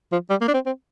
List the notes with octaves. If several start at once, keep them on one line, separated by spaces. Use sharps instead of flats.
F3
G3
A#3
D4
C4
C4